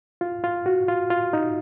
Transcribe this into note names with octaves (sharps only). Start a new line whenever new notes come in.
F4
F4
F#4
F4
F4
D#4